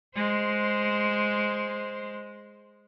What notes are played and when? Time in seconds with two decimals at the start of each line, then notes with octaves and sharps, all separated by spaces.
0.15 G#3 C5